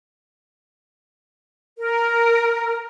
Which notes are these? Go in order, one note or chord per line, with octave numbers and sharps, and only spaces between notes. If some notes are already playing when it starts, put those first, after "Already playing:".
A#4